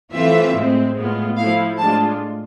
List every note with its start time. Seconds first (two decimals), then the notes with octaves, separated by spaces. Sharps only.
0.12 E3 A3 C4 F4 E5
0.55 A2 G#3 C4
0.96 A2 G#3 B3 F4
1.37 F3 A3 E4 F5
1.78 A2 G#3 D4 F4 A5